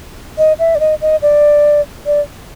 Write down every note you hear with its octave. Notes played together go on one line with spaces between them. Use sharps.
D#5
E5
D5
D#5
D#5
D5
D5